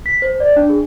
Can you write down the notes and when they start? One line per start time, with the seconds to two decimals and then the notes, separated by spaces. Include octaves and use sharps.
0.06 B6
0.22 C5
0.40 D5
0.56 D4
0.69 G#4